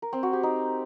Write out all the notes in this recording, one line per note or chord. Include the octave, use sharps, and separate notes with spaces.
A#4
C4
F#4
G4
D#4